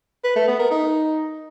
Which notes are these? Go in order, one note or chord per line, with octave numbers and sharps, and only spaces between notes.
B4
A3
B3
A#4
D#4